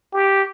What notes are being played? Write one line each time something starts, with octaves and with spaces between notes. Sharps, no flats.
G4